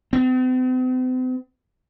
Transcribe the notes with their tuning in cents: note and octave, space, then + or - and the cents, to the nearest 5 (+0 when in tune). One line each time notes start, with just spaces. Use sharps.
C4 -45